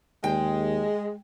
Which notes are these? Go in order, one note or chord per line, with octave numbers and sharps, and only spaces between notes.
D#2 G#3 G5